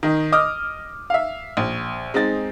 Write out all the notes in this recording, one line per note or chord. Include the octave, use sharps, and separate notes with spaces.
D#3 D#4
D#5 D6 D#6 F6
E5 F5
A#1
G#3 C4 D#4 A6